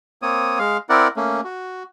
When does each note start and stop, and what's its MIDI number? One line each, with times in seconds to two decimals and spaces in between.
0.22 0.59 58
0.22 0.59 60
0.22 0.59 73
0.22 0.59 87
0.59 0.77 56
0.59 0.77 77
0.89 1.08 60
0.89 1.08 64
0.89 1.08 70
0.89 1.08 74
0.89 1.08 78
1.16 1.41 57
1.16 1.41 58
1.16 1.41 61
1.44 1.83 66